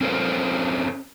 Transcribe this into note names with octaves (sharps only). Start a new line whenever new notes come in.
C4 C#4 A4 A#4 C5